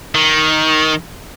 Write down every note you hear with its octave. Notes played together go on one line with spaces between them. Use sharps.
D#3